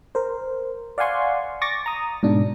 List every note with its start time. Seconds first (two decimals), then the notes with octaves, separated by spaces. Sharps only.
0.15 A#4 C5
0.98 D5 F5 F#5 G#5 C6 C#6
1.62 C#6 D6 A6 A#6
1.86 A#5 D#6
2.23 G#2 B2 D4